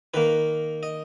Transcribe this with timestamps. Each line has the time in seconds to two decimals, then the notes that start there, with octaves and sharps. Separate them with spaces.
0.14 D#3 A#3 B4
0.83 D#5